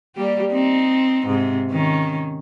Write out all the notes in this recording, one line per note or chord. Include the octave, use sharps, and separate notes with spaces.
G3 A#3 G4
C4 D#4
G#2 C3
D#3 C#4